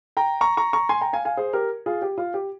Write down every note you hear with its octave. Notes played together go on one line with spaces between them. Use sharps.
G5 A#5
A#5 C#6
A#5 C#6
A#5 C#6
G#5 C6
G5 A#5
F5 G#5
F5 G#5
G#4 C5
G4 A#4
F4 G#4
G4
F4
G4